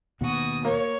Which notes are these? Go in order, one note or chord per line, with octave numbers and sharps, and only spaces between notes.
D#2 B2 F#4 D#6
A#3 C#5